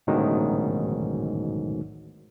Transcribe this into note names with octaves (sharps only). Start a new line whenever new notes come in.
A1 D2 G#2 B2 D#3 F#3